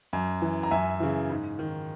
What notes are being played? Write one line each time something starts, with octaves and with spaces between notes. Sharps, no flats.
F#2
E3
A#5
F#2 E5 G#5
C#3 E3
G#2
D#3